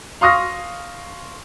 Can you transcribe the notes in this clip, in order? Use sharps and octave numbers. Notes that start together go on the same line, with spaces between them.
F5 C6 C#6 D#6 F6 A#6